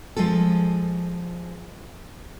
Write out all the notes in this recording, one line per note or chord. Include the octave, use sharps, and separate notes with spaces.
F3 G#3 F4 A4